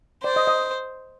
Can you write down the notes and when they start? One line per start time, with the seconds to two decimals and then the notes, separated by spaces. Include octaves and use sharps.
0.24 C5 D5
0.36 D#5
0.47 D#5